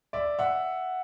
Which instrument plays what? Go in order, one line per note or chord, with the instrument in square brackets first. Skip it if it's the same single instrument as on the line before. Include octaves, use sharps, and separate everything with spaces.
[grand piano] D5 E5
E5 F#5